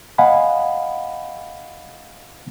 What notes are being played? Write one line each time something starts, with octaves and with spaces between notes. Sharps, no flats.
D#5 F5 F#5 G#5 B5